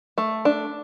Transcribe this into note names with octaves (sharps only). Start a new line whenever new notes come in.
A3
D4